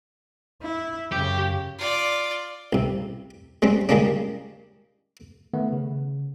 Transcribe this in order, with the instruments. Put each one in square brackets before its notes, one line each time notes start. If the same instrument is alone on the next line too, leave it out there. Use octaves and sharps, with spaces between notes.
[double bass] E4
[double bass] F#2 C#3 [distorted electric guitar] G4
[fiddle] F4 D5
[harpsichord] C2 C3
G3 G#3 C4 C#4
D#3 G3 G#3 A#3 C#4 D4
[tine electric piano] D#3 A3 B3
C#3